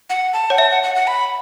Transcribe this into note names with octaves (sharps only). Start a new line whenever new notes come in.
F#5
A5
C#5 F#5
E5 A5
F#5
F#5
F#5
B5